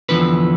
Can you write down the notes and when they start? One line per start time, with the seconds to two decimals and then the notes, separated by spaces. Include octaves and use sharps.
0.09 E2 D3 F3 B4